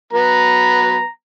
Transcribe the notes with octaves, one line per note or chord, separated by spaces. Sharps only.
F#3 B3 B4 A#5